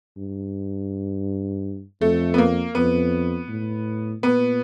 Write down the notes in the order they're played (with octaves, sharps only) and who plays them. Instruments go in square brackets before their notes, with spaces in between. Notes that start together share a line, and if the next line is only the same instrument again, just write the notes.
[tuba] G2
[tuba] F2 [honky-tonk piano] A3
[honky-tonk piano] B3
A#3
[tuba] F2 [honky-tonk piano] B3
[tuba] A2
[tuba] A#2 [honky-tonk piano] B3